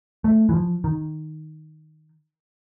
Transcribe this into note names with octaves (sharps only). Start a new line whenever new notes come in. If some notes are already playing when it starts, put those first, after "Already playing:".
A3
E3
F3
D#3